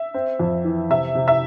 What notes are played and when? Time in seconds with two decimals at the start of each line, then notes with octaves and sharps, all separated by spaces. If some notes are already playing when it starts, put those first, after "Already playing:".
Already playing: E5
0.14 C4
0.39 F2
0.64 E3
0.90 C3 E5
1.15 C3
1.28 E5